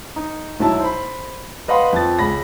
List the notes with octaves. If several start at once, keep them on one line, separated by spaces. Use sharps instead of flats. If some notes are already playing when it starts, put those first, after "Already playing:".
D#4
B1 F#3 E4 A5
C5 B5
B4 D#5 F5 F#5 B5 C6
F2 F3 A6
C#2 B5 A#6